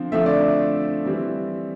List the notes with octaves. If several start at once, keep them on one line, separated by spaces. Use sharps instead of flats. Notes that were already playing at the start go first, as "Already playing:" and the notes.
Already playing: D3 F3 C4
D3 F3 A3 C4 E5
D5
E5
E3 G3 C4